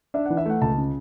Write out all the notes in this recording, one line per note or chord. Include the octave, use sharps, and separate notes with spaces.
D4 E5
F#5
E3
E5
A3 F#5
C#2 A5
C#3